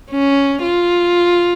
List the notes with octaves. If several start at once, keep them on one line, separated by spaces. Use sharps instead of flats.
C#4
F4